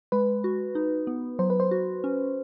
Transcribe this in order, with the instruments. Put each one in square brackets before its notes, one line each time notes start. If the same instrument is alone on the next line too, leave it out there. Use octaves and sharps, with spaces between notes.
[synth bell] G#3 [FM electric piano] B4
[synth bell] F#4
D#4
B3
[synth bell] F#3 [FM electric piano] C5
[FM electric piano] B4
C5
[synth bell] F#4
C#4